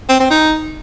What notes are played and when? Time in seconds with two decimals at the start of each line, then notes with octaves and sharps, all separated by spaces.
0.09 C4
0.20 C4
0.31 D#4